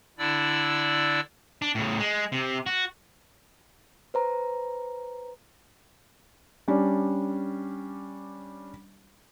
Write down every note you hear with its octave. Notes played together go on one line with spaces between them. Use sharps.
D3 D4 E4 D5 E6
D4
A2 C#3
G#3
C3
F#4
B4 C5 A#5
G3 C#4 D4